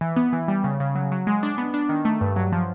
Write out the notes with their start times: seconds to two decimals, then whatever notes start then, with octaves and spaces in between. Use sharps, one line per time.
0.01 E3
0.16 B3
0.33 E3
0.48 G3
0.64 C#3
0.80 C#3
0.95 F#3
1.12 F#3
1.27 G#3
1.43 D4
1.58 B3
1.74 D4
1.89 D#3
2.05 A3
2.21 G2
2.36 F#3
2.52 F3